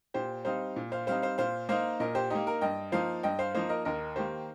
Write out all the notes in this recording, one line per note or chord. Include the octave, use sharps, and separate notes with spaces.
A#2 G4 C5
G3 C4 D#4 C5 F5
A#2
C5 F5
G3 C4 D#4 C5 F5
C5 F5
A#2 C5 F5
A#3 D#4 C5 F5
A#2 A#4 D#5
G4 C5
A#3 D#4 G4
A#4
G2 D#5 G5
F3 A#3 D#4 C5 F5
G2 D#5 G5
C5 F5
F3 A#3 D#4 C5 F5
A#4 D#5
D#2 A#4 D#5
D#3 A#3 G4 C5